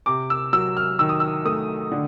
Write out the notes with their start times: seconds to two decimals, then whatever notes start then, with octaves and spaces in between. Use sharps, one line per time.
0.06 C3 D6
0.30 E6
0.53 F#3 E6
0.77 F6
0.99 D#3 E6
1.09 D#6
1.20 E6
1.45 A3 D#6
1.92 D3